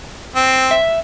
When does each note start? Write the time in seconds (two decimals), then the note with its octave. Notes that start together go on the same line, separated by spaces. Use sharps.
0.35 C4
0.71 E5